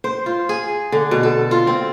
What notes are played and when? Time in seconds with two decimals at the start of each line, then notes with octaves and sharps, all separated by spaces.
0.04 C5
0.26 F4
0.49 G#4
0.92 D3
1.11 B2
1.23 A4
1.51 F4
1.67 C4